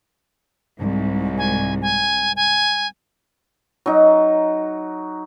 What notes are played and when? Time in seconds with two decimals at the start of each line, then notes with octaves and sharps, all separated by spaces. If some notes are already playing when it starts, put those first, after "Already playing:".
0.78 C2 G#2
1.38 G#5
1.81 G#5
2.36 G#5
3.86 F#3 D#4